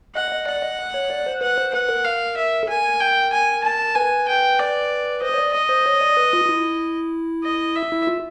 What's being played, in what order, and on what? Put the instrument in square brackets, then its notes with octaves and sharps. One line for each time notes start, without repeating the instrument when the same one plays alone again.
[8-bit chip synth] D#5 [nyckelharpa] F#5
[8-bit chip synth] D#5
[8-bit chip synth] D5 [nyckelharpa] F#5
[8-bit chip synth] D#5
C#5
D5
C5
[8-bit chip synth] B4 [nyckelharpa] F#5
[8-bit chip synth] C5
[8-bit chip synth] B4 [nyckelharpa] F#5
[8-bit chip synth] A#4
[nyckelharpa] F5
E5
[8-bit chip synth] A4
[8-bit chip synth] A#4 [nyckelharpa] G#5
[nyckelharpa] G5
G#5
A5
[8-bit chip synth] B4 [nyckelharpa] G#5
[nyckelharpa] G5
D5
[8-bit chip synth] C5 [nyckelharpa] D#5
[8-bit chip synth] C#5
D5
[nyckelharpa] D#5
[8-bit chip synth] C5
C#5
D5
B4
F4
F4
E4
[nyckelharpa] D#5
E5
[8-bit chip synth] E4
F4